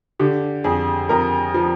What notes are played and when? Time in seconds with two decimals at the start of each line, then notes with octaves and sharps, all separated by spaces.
0.19 D3 G4
0.64 F2 G#4
1.09 F2 A#4
1.54 F3